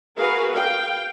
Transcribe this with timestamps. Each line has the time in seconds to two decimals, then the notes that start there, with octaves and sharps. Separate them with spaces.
0.17 F#4 G#4 A#4 B4 F5
0.53 F5 G5